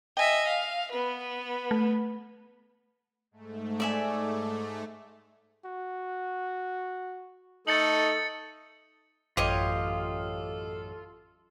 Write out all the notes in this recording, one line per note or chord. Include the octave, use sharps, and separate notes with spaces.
D#5 E5 G5 G#5
F5
B3 B4
A3
G#2 A3
D5 E5 G#5
F#4
A3 D#4 A4 A6 C#7 F#7
A1 F#2 F4 G4 A4 C#5 D#5